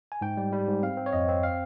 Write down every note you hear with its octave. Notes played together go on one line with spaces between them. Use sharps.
G#5
G#2 G5
G3
G3
G#2
C4 F5
C4
C#5
F2 D#5
C4
F5